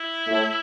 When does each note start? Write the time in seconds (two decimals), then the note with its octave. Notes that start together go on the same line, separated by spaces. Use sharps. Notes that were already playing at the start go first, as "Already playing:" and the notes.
Already playing: E4
0.27 A2 A3